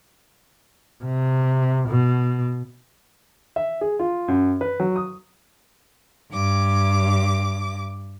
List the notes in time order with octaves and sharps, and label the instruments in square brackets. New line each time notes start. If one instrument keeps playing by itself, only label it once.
[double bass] C3
B2
[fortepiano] E5
G#4
F4
F#2
B4
F#3
D#6
[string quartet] G2 D6